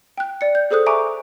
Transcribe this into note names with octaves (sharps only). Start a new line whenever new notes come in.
G5 F#6
D5 C#7
G6
G#4 A4 C5 D#6 F#6
E5 G#5 A#5 C#6 D6 D7